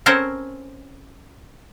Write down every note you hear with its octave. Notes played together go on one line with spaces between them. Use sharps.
C4 C#4 A4 A#4 C5 C#5